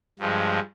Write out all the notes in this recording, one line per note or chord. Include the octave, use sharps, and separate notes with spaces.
G2 F3 G#3